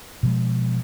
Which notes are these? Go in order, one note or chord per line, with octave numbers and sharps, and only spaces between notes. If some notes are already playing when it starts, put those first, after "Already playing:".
B2 F3 G#3